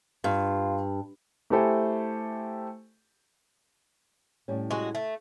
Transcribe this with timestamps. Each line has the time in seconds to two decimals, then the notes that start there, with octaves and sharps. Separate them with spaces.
0.24 G2 F4
1.50 A3 E4 G4 A4 C5 G#5
4.48 A2 G3 C#4
4.70 G#3 F#4
4.95 A3